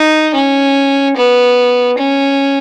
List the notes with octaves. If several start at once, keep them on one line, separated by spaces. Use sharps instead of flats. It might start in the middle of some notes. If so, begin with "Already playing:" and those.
Already playing: D#4
C#4
B3
C#4